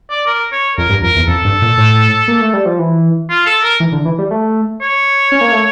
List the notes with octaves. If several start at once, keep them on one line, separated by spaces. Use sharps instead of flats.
D5
A#4
C#5
F2 A#4
G2
F2 A#4
E2
F2 A4
G2
A#2
A2
A#3
A3
G3
F3
E3
F4
A4
A#4
E3
D3
E3
G3
A3
C#5
C#4
A#3
A3